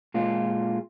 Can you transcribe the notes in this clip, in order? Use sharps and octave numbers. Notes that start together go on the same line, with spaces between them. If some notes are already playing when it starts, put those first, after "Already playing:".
A#2 G#3 F4